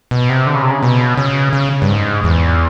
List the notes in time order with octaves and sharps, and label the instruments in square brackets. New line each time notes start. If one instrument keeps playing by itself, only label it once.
[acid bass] B2
C3
D3
C#3
C3
C#3
B2
C#3
C#3
G2
G#2
E2